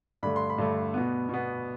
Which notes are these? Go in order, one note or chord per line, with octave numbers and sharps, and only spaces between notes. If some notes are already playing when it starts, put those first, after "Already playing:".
G2 D3 A3 B5
C6
B5
G2 D3 A3
B2 B3
B2 B3